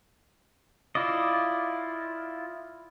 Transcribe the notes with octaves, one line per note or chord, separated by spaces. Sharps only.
E4 F4 D5 D#5